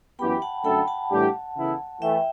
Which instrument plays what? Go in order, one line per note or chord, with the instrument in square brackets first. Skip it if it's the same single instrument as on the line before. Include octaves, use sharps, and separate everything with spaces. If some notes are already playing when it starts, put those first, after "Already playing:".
[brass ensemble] F#2 E3 B3 E4 G4 [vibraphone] G5 B5
[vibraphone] F#5 A5
[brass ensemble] F#2 D3 A3 D4 A4 [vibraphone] G5 B5
[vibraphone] F#5 A5
[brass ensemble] A2 E3 G3 D4 G4
C#3 E3 B3 E4 A4
[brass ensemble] E3 A3 [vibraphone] E5 G5